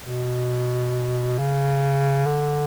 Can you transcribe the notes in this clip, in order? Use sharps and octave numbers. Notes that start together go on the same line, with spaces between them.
B2
C#3
D3